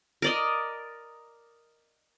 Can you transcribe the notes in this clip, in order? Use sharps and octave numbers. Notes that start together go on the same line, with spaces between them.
A#4 D5 D#5